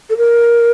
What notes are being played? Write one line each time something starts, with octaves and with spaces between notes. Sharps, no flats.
A4
A#4